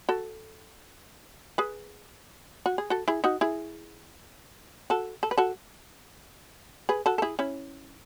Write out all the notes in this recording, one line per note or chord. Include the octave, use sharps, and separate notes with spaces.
F#4 A4
G#4 B4
F#4
G#4
F#4 A4
E4 G#4
D#4 F#4
E4 G#4
F#4 A4
A4
B4
F#4 A4
G#4 B4
F#4 A4
A4
E4 G#4
C#4 E4